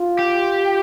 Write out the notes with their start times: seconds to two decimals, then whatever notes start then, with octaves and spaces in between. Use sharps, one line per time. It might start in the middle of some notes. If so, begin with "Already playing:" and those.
Already playing: F4
0.19 G4